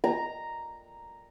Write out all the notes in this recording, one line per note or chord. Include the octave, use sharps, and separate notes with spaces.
A#5